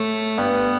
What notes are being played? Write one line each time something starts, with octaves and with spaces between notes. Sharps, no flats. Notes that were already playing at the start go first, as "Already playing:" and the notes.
Already playing: A2 A3
G2 B3